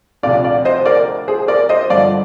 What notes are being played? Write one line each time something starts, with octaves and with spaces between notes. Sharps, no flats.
D2 C3 F3 D5 F5
D5 F5
C5 D#5
A#4 D5
G#4 C5
A#4 D5
C5 D#5
G2 D3 F3 D5 F5